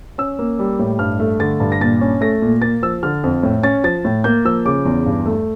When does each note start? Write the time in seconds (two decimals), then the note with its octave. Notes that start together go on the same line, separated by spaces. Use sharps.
0.18 C#4 E6
0.39 A#3
0.59 G3
0.79 A2
0.99 G2 F6
1.20 A3
1.40 D3 A6
1.60 G2
1.72 A#6
1.81 A#2 A6
2.01 C#4
2.21 A3 A#6
2.42 A#2
2.62 A#3 A6
2.82 F3 E6
3.03 D3 F6
3.24 F2
3.43 A2
3.64 C#4 A6
3.84 F3 A6
4.05 A2
4.24 A#3 G6
4.45 F3 E6
4.65 C#3 D6
4.85 E2
5.06 G2
5.26 A3